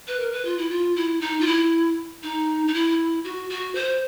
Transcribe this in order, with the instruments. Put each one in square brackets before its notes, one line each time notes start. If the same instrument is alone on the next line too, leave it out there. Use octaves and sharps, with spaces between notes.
[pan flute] B4
A#4
B4
F4
E4
F4
E4
D#4
F4
E4
D#4
D#4
E4
F#4
F#4
C5